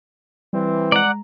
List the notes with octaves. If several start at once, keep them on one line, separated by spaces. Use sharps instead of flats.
E3 G3 C4
G#3 D5 F#5 A#5